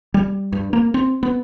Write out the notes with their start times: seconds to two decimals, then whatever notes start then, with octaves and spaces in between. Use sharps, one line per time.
0.14 G3
0.52 G2
0.73 A#3
0.94 C4
1.23 B3